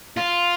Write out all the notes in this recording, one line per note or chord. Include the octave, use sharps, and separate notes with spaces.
F4